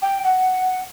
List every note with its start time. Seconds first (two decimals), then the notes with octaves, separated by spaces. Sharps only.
0.02 G5
0.24 F#5